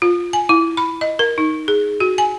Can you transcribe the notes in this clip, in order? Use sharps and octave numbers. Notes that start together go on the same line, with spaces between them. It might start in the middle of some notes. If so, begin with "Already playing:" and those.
F4
G#5
E4
B5
D#5
A#4
D#4
G#4
F#4
G#5